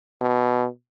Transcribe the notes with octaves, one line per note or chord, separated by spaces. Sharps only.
B2